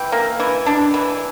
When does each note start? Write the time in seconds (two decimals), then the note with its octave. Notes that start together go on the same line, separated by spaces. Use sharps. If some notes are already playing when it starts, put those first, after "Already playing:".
Already playing: E3 G5
0.12 A#3
0.40 E3
0.66 D4
0.94 E3